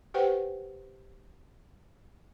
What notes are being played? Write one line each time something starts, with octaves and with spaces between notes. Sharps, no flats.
G4 B4 C5 F#5 G5